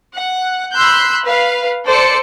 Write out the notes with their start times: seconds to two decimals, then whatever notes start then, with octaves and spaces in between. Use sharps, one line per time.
0.15 F#5
0.73 B5 C6 E6 F#6 G6
1.24 B4 F5
1.87 A4 C5 D5 C#7